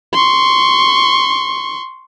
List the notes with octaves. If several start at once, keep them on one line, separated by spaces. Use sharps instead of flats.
C6 C#6